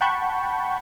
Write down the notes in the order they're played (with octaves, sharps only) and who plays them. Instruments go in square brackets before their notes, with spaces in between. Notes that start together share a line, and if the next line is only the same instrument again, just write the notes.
[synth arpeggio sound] F#5 G5 A5 B5 C#6 G6